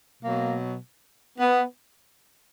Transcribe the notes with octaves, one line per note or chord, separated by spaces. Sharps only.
B2 F#3 A#3
B3